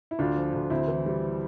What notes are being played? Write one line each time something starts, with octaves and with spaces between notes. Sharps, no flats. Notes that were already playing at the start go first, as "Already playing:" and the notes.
E4
D2 D4 F4
F3
D2
D2 C4 E4
E3
G3